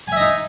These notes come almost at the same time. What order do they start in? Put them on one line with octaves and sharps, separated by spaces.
G#5 E5 D#5 D#4